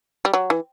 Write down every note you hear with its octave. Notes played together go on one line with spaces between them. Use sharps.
G3
F#3
E3